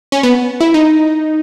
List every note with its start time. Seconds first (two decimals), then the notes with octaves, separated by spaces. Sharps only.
0.12 C#4
0.23 B3
0.60 E4
0.74 D#4